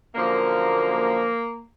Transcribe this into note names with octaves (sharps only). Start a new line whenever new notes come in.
F#2 D3 F3 A#3